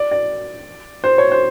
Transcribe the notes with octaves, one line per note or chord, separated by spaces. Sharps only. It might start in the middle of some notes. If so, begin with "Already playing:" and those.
Already playing: D5
D5
C5
C#5
C5